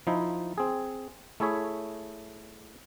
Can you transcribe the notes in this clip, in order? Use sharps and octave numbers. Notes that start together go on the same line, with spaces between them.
F3 D#4 E4
C4 G#4
A3 E4 G#4 C#5 E5